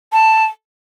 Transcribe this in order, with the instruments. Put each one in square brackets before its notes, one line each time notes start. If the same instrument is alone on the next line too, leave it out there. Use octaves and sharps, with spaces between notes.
[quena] A5